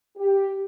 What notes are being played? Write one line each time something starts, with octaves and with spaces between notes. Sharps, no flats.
G4